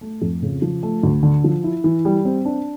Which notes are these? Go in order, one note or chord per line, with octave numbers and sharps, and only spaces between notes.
A3
F2
C#3
F3
A3
D2
D3
F3
E4
E3
G3
C4
D4